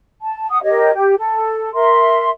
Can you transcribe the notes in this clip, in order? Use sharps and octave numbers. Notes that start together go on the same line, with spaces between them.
A5
F#5 D#6
G4 A#4 C#5 D#5
G4
A4
A#4 E5 C6